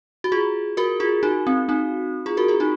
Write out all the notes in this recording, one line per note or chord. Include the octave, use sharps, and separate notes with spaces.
F#4
F4 G#4
F#4 A#4
F4 G#4
D#4 F#4
C4
C4 D#4
F4 G#4
F#4 A#4
F4 G#4
D#4 F#4